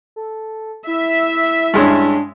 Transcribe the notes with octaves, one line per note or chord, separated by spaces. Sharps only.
A4
E4 E5
G2 G#3 C#4 D4